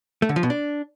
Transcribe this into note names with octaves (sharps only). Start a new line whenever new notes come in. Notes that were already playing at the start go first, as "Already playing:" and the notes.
A3
D3
F3
B2
D4